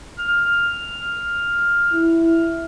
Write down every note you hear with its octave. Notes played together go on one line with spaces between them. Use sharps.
F6
E4